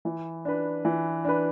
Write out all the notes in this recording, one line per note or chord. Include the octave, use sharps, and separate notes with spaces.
E3
D4 B4
E3
D4 B4